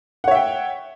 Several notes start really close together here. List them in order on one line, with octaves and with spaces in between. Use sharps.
F#5 C#5 E5 G5